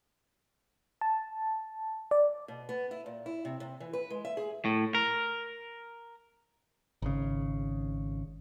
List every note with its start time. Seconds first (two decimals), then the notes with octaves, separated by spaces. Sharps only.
1.01 A5
2.11 D5
2.48 B2
2.69 B3
2.91 E4
3.06 A#2
3.26 E4
3.45 C3
3.60 C3
3.80 E3
3.93 B4
4.10 G#3
4.25 E5
4.37 G#4
4.65 A2
4.95 A#4
7.02 G#1 C#3